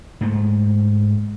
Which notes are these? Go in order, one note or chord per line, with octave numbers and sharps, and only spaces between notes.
G#2 A3